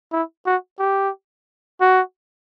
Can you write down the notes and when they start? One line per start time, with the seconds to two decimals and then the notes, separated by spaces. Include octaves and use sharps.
0.12 E4
0.46 F#4
0.79 G4
1.81 F#4